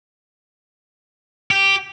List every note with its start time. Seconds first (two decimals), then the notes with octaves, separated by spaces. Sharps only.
1.51 G4